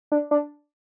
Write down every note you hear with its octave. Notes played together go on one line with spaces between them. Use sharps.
D4
D4